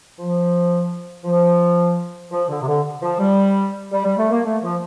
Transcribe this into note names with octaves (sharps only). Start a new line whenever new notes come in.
F3
F3
F3
D3
C3
D3
F3
G3
G3
G3
A3
A#3
A3
F3